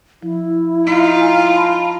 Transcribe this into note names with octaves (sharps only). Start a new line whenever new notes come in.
F3 E4
D#4 F4 F5
G#5 F6
A5 B5 C6